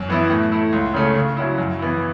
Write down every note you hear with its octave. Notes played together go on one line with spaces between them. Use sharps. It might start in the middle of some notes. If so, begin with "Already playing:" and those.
Already playing: F#2
E3 B3 E4
A2
A3 E4
C#2
C#3 A3 C#4
C#3
F#3 C#4 E4
F#2
E3 B3 E4